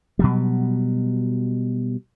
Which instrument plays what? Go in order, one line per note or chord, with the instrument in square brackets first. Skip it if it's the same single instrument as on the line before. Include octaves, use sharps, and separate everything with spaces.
[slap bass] B2 F#3 G3